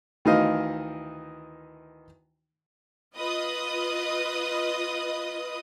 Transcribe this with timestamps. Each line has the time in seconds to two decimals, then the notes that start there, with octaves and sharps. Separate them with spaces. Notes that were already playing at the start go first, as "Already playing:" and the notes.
0.25 D2 D#3 E3 D#4 D#5 F5
3.16 F4 B4 D#5 D#6